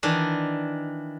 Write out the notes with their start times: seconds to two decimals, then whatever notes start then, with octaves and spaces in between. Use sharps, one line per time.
0.03 D#3 E3 D4